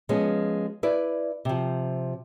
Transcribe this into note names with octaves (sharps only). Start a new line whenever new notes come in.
F3 G#3 B3 C#4
E4 B4 D5
C3 F3